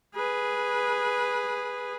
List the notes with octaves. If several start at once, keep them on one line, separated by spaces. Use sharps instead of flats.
G#4 B4